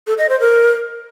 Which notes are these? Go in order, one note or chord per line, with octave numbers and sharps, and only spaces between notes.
A4
D#5
C5
A#4